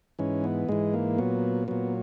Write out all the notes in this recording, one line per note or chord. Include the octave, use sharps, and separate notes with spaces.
G#2 E3 C#4
B3
G#2 E3 G#3
A#3
A#2 F#3 B3
A#2 F#3 B3